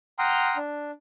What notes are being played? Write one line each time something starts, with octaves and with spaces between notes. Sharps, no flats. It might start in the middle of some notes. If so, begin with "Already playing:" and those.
F#5 G5 A#5 C6 D#6 F6
D4